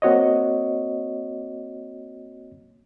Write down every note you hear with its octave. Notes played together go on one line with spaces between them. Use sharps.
A#3 C4 F#4 C#5 D#5